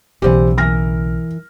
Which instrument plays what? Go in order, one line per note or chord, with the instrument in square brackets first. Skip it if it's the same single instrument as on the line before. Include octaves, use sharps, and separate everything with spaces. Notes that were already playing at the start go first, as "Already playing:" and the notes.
[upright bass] B1 C#3 [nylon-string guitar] E3 D5 F#5 [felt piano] G4 C5
[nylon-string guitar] E3 A#4 [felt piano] F6 A#6